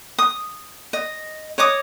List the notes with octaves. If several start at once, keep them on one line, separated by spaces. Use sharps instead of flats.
D#6
D#5
C#5 D#5 D6 D#6